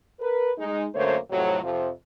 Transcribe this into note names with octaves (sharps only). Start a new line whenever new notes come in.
A#4 B4
G#3 D#4
F#2 D3 A3 A#3 C5 C#5
F2 A2 C3 F#3
F2 C3 F3